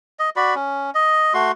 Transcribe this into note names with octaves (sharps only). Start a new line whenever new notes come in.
D#5
F#4 D5 B5
C#4
D#5
A3 F#4 C6